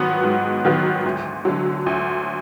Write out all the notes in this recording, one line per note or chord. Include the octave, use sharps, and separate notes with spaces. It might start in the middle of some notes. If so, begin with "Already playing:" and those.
Already playing: G#2 D#3 F#3 B3
G#2
D#3 F#3 B3
D2
D3 F#3
D2